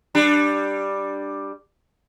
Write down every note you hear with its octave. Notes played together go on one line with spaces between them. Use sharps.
G3 D4